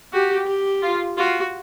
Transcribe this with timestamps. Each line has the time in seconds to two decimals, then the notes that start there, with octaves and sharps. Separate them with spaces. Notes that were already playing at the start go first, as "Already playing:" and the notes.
0.13 F#4 G4
0.47 G4
0.82 F4
1.18 F4 F#4